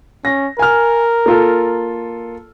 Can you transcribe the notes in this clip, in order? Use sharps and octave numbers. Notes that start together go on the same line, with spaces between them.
C#4 A#6
A#4 G#5 F6
A#3 F4 A4